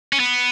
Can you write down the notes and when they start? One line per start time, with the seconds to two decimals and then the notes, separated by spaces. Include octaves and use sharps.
0.13 C#4
0.20 B3